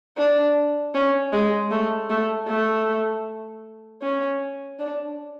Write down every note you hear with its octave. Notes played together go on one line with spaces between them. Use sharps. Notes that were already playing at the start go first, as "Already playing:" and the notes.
D4
C#4
G#3
A3
A3
A3
C#4
D4